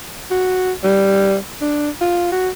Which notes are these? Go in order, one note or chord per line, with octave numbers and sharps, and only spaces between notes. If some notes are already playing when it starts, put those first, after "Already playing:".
F#4
G3
D4
F4
F#4